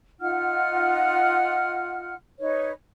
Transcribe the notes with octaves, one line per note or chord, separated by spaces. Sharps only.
D#4 F4 F#5 F6
D#4 B4 C#5